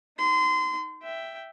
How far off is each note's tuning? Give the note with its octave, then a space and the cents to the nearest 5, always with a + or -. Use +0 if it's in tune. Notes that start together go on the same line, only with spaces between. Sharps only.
D#4 +20 C6 -30
E5 +5 G5 +0